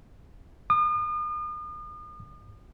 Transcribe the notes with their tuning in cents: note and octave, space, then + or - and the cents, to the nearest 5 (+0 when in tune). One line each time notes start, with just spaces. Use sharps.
D#6 -40